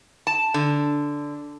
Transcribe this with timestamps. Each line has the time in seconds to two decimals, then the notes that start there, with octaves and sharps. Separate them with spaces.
0.27 A5
0.54 D3